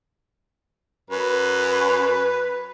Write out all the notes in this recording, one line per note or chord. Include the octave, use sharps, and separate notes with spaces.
F#2 B4